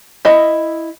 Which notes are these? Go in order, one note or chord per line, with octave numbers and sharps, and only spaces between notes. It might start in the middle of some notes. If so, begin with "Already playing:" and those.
E4 D#5